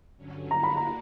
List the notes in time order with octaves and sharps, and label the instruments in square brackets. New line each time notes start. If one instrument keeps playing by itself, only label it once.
[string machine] G2 D3 F#3 C#4
[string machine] D3 A#3 D4 F#4 [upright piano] A#5
[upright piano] B5
A#5